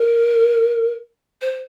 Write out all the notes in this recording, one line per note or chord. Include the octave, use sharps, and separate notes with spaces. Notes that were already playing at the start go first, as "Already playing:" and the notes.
Already playing: A#4
C5